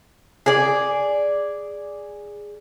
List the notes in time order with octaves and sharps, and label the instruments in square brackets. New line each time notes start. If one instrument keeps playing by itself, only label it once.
[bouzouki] G#4 D5